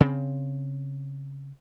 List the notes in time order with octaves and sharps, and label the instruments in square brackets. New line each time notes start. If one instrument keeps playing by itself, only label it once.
[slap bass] C#3 C4